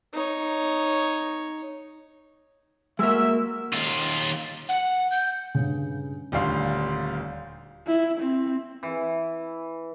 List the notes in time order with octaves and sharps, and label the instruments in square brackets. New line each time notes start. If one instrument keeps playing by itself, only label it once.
[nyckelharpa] D#4 C#5
[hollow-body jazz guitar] G#3 A#3 [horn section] F#4 A#4 E5
[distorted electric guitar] D#2 F4
[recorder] F#5
G6
[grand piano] G2 C#3
D#1 D2 G3 D4 F5 C6
[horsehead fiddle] E4
C4
[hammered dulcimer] E3